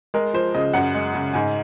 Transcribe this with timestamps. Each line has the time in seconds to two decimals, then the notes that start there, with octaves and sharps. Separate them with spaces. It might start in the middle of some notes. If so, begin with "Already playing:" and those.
0.14 G#3 A#4
0.33 F3 C5
0.54 C#3 D#5
0.73 F#2 F#5
0.94 G#3
1.14 C#3
1.34 G#2 G#5